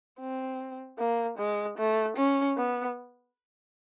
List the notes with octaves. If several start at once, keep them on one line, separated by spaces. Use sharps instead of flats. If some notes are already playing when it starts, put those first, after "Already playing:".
C4
A#3
G#3
A3
C#4
B3